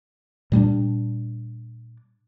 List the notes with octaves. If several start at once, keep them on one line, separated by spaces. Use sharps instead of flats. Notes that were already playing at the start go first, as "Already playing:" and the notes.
A#2 G3 A3 D4